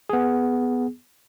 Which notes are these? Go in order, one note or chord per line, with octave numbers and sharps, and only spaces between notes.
B3 G#4